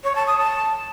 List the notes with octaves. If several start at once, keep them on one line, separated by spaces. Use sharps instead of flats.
C#5
A5
D#6
A5